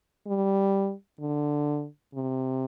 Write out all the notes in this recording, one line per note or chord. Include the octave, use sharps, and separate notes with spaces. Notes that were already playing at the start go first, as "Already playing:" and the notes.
G3
D3
C3